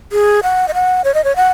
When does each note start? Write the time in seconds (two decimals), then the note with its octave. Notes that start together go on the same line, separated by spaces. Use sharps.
0.12 G#4
0.43 F#5
0.68 D#5
0.74 F#5
1.04 C#5
1.14 D#5
1.24 C#5
1.36 F#5